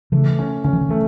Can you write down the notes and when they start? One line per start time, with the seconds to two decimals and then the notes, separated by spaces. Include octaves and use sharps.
0.12 C#3 E3 A3
0.39 C#4
0.64 D3 C#4
0.73 E3
0.81 D3
0.89 E3 A3